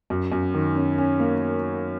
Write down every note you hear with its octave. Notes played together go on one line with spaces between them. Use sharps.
F#2
F#2
D#3
C#4
C#4
A#3